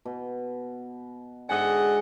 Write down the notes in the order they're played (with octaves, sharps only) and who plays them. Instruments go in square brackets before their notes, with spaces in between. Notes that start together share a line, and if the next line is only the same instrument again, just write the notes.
[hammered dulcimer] B2
[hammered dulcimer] G#2 G#5 [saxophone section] D3 D#5 F#5